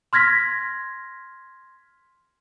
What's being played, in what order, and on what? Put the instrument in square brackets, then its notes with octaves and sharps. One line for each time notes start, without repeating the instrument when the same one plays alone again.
[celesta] C6 F6 G#6 A#6 B6